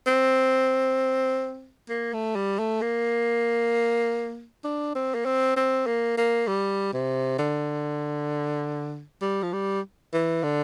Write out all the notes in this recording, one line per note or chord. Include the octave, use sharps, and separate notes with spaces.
C4
A#3
A3
G3
A3
A#3
D4
C4
A#3
C4
C4
A#3
A#3
G3
C3
D3
G3
F3
G3
E3
D3